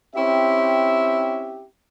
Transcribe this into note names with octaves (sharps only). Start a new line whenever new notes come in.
C4 C#4 E4 G4 E5